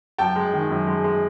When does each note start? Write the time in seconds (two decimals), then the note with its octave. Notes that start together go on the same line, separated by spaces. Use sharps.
0.18 F#2 G5 A5
0.36 G#3
0.54 D#3
0.70 F#2
0.87 G#3
1.04 G#3